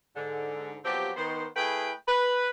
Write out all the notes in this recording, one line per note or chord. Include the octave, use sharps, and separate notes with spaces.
G#2 D3
F3 F#3 B3 C4 G4
D#3 B3 C5
A3 E4 G#4 B4 G5
B4